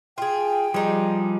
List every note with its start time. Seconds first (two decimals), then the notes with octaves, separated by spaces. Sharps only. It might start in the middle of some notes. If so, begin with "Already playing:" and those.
0.18 F4 G#4 G5
0.74 F3 G3 G#3 D#4